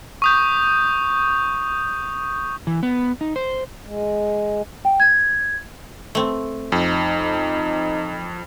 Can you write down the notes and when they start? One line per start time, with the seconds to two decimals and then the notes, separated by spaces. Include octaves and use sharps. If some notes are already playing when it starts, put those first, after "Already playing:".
0.22 C#6 D#6 G6
2.67 E3
2.83 B3
3.21 D#4
3.36 C5
3.86 G#3
4.85 G5
5.00 G#6
6.15 A3 C4
6.72 F2 D#4